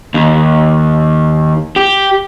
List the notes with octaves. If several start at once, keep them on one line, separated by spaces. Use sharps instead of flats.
D#2
G4